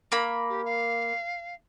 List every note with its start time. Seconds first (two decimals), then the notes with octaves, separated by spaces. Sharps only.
0.12 A#3 B5
0.49 G4
0.65 F5